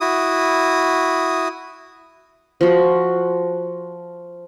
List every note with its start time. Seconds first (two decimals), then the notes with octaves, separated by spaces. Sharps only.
0.01 E4 F#4 D#6
2.61 F3 F#4